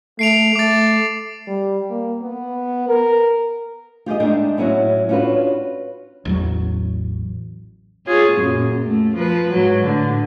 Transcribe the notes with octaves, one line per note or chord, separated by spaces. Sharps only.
A3 C7 D7 F7
A3 D6 A6
G3
A#3
B3
A#4
F4 G4 G#4 D#5
G#3 A3 D4 D#4 G#4 G5
A2 F#3 C#4 E4 F#4
C#4 D4 F4 F#4 B4
A1 E2 F#3
F4 G#4 C#5
F#2 A#2
A3
F3 B4
G#2 F#3
A2 D3